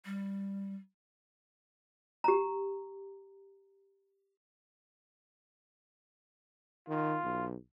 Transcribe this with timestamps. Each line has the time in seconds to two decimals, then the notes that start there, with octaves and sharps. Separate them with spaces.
0.05 G3
2.24 G4 A#5
6.89 D#3 F4
7.24 B1